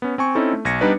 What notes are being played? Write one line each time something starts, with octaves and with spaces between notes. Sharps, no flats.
B3 C#4
C4 G#5 C#6
C4 C#4 D#4 E4 A4
A3
B1 G#6 A#6 C#7
G3 B3 D4 D#4 B4 D5